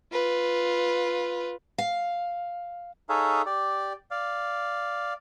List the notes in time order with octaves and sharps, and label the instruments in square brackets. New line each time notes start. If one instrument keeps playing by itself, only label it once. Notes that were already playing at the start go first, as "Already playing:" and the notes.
[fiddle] F4 B4
[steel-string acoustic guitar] F5
[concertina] D#4 G#4 A4 C#5 E5 F5
G4 D5
D5 F5